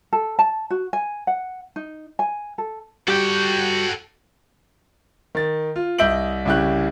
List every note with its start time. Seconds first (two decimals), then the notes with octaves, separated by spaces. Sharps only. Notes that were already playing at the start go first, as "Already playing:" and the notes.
0.13 A4
0.39 A5
0.70 F#4
0.93 G#5
1.27 F#5
1.76 D#4
2.19 G#5
2.58 A4
3.08 G3 F#4 G4 A4 G5
5.35 D#3 A6
5.76 F4
5.98 C2 D#5 E5 G6 D7 F#7
6.45 C2 C#3 E4 G4 F#6